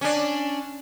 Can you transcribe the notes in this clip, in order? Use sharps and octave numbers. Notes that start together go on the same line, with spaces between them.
C#4 D4